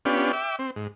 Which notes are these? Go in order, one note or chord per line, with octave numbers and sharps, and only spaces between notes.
B3 C#4 D4 F4 G4
E5 G5 D6
C4
G#2